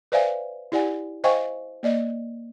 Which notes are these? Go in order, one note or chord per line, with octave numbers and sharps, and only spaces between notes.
B4 C5 D5 E5 F5 G#5
E4 G4 D5 F#5 G#5
C5 D#5 F5 G5 G#5 C#6
A#3 D5 D#5